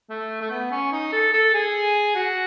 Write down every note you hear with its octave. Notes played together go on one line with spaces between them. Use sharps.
A3
A3
B3
C#4
D#4
A4
A4
G#4
F#4